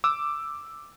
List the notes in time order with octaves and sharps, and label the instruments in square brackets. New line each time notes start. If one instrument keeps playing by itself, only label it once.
[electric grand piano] D6 E6